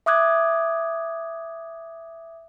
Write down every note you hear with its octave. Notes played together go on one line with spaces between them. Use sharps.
E5 D6 D#6 F#6 G#6